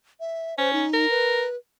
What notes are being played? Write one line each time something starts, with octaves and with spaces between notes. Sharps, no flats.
E5
C#4 C5
D#4
A#4
B4